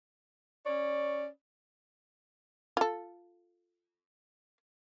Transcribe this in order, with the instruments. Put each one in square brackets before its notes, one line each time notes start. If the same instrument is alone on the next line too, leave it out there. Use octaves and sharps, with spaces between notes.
[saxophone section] C#4 C#5 D5
[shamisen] F4 A4